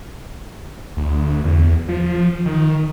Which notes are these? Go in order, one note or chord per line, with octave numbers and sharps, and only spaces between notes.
D2
E2
F3
D#3